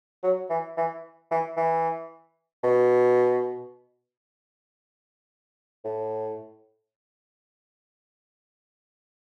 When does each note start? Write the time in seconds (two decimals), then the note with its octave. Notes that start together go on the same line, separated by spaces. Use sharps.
0.23 F#3
0.50 E3
0.77 E3
1.31 E3
1.57 E3
2.64 B2
5.85 A2